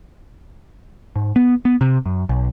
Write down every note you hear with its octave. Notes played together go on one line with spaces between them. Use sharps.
G#2
B3
B3
C3
F#2
B1